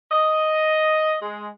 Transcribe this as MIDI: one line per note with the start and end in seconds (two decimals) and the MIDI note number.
0.11 1.15 75
1.22 1.48 56